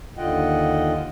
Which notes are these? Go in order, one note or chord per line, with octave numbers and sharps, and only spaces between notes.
D#2 D3 F4 D#5 F#5 G5